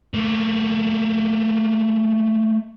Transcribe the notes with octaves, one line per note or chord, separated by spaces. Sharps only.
A3 A#3